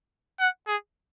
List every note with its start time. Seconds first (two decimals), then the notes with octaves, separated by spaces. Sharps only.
0.40 F#5
0.68 G#4